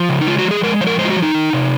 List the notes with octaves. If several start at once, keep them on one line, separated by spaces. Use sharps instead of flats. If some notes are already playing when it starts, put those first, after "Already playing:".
Already playing: F3
C#3
D#4
G#3 F4
F#4
F3
G#4
G#3 A#4
F3 C5
A#4
G#3 C5
F4
F#4
F3
D#4
D#3
C3